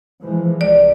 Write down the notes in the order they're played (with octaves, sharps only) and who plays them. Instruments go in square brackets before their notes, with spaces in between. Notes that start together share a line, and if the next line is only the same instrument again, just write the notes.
[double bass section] E3 F3 G#3
[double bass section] C2 [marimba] D5